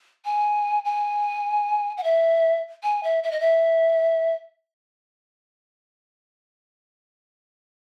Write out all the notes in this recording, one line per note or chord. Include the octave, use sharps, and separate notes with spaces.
G#5
G#5
F#5
E5
G#5
E5
E5
D#5
E5